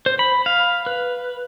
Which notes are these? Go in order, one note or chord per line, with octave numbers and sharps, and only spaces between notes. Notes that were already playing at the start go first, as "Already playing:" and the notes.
C5
B5
F5
B4